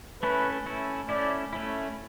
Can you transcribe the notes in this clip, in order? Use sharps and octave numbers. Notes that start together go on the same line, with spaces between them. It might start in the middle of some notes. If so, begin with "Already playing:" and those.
A3 C#4 E4 B4
A3 C#4 E4
A3 C#4 E4 D5
A3 C#4 E4